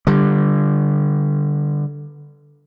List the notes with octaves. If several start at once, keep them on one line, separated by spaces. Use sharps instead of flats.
D3 G3